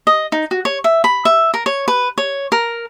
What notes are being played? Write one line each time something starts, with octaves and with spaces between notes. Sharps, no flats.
D#5
D#4
F#4
C#5
E5
B5
E5
A#4
C#5
B4
C#5
A#4